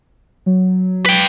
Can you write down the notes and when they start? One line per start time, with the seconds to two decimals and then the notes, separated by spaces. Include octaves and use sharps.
0.46 F#3
1.06 B4 G5